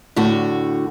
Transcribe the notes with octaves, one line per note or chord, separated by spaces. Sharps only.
A2 D3 F#4